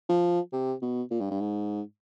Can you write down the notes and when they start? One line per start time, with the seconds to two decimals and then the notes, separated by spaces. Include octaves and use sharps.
0.09 F3
0.53 C3
0.82 B2
1.11 A#2
1.21 G2
1.31 G2
1.40 G#2